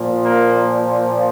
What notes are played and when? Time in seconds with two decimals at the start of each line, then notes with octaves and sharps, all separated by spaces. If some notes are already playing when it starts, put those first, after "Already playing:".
Already playing: A#2 F3
0.23 A#3